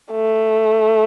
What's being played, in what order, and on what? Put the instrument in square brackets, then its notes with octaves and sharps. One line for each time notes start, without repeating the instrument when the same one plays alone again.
[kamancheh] A3